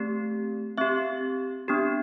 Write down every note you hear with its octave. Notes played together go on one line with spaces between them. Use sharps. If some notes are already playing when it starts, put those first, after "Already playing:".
Already playing: A3 C4 G4
C4 G4 E5
B3 D4 G4